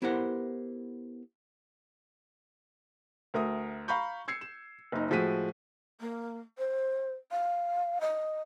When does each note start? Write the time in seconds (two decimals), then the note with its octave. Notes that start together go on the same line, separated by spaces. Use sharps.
0.02 B3 E4 G4 A#4 C5 F#5
3.34 D2 A#4 E5 D#6
3.88 F5 A#5 B5 C#6 G6
4.28 E6 G#6 C7 C#7
4.41 E7
4.92 F#1 D#4
5.10 A2 F3 G#3 F#4 B6 D#7
6.00 A#3
6.58 C5
7.32 F5
8.01 D#5